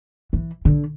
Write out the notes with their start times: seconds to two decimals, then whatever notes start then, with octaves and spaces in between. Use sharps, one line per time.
0.33 E3
0.65 D3